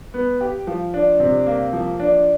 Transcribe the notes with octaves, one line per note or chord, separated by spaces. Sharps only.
B3
G4
F3
D4
C3
A#3
F3
D4